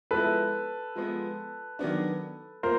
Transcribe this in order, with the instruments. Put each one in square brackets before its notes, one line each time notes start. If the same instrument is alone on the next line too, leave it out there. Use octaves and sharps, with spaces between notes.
[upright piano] F3 G#3 B3 E4 [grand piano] A4 B4
[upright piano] F3 G#3 B3
D#3 F#3 B3 D4
[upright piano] F3 A#3 [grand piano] A#4 C5